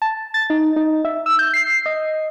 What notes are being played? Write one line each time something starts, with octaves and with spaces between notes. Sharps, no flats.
A5
A6
D#4
D#4
E5
E6
G6
C7
D#5